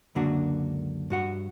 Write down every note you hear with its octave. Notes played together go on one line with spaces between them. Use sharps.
C#2 F#2 D3 A#3 D4 F#4
G2 F#4 F#5